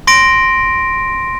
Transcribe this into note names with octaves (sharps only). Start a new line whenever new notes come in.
C6 A#6 D7